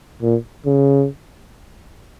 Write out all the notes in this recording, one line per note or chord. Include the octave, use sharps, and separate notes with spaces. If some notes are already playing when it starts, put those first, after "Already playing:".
A#2
C#3